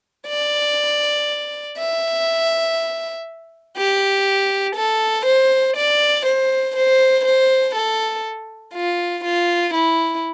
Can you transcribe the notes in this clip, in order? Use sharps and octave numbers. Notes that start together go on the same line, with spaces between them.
D5
E5
G4
A4
C5
D5
C5
C5
C5
A4
F4
F4
E4